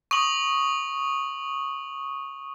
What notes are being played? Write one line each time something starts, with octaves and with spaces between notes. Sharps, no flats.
C#6 D#6 F#7